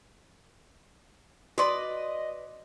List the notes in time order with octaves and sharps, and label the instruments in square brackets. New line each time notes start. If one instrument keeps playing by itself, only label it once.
[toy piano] F#4 C6 [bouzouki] B4 D5 [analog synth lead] D#5